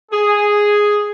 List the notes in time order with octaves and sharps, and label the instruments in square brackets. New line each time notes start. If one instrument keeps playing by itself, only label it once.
[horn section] G#4